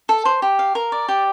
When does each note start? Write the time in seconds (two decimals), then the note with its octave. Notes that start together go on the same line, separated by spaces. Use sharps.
0.09 A4
0.25 C5
0.42 G4
0.59 F5
0.75 A#4
0.92 D5
1.09 G4